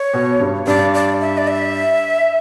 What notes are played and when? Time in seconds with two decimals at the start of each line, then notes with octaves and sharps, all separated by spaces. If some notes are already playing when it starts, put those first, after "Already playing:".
Already playing: C#5
0.13 B2
0.40 G2
0.67 G2 D5
0.94 D5
1.21 E5
1.38 D5
1.48 E5